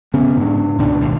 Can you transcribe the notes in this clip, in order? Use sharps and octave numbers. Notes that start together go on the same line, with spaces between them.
C#3 B3 C#4
G#2 D4
C#2 B2 D4
G#1 D#2